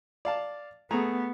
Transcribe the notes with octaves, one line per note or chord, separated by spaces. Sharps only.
D5 F5 A5
A3 B3 G#4 A#5